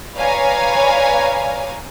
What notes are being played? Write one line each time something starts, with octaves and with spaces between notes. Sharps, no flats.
B4 C#5 D5 F5 G#5 A#5